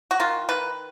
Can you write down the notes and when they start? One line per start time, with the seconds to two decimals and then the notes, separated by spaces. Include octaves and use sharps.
0.11 F#4
0.20 D#3 F4
0.49 D#3 B4